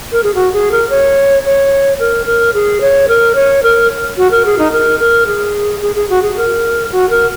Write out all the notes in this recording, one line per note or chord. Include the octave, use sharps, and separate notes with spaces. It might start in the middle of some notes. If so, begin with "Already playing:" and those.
A#4
G#4
F#4
G#4
A#4
C#5
C#5
A#4
A#4
G#4
C#5
A#4
C#5
A#4
F#4
A#4
G#4
D#4
A#4
A#4
G#4
G#4
G#4
F#4
G#4
A#4
F#4
A#4